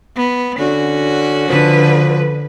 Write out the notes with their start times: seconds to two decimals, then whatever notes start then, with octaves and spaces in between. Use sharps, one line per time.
0.16 B3
0.59 D3 C#4 F#4
1.48 D3 F3 B4